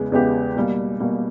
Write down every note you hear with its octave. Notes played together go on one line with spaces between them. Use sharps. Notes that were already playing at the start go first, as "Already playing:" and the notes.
Already playing: E2 C#3 G#3 B3
E2 C#3 G#3 B3 G4
B2 G3 A#3
B2 G3 A#3